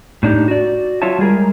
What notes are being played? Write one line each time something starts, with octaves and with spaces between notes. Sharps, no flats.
A2 D4 D#4 G4
F#4 D5
F#3 F4 F#4 C#5 E5 A5
G3 G#3 G#4 A#4